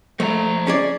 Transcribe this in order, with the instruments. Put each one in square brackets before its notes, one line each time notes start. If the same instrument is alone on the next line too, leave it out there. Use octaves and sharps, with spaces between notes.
[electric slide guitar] F3 E5 A#5 [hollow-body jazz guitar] A3
[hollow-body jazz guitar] C#4 G#4 D5